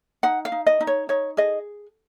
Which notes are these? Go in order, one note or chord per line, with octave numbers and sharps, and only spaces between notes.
D#4 F#5
F5
D#4
D#5
D#4
C#5
D#4 C#5
G#4 D#5